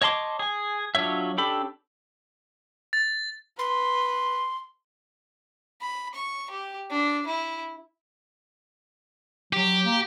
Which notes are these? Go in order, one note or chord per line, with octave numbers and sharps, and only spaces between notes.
C#5 D#5 A5 C6 D6
G#4 G#5
F#3 D4 F4 C#5 E5
C#4 D4 G4 A4 B5
A6
B4 C6
B5
C#6
G4
D4
E4
F#3 G4
A#3